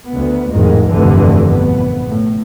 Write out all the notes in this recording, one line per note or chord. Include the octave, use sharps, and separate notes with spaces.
D2 B3
A1 F2 G#2 D#3 G#3
F1 D2 G2 B2 D3 E3
A#1 B3
A2